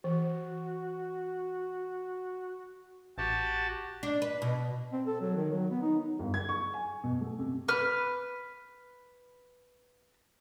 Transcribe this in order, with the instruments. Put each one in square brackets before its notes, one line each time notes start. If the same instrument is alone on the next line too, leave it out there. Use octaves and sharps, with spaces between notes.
[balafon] E3 [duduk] F#4
[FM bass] A1 [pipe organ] F#4 G4 A5
[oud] D4
B4
B2
[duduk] C4
A4
F#3
D#3
F#3
B3
D#4
[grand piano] G1
G#6
C#6
G#5
B2
A3
C3
[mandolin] B4 F6